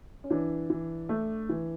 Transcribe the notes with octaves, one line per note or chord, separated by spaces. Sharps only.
C#4
E3 D4
E3
A3
E3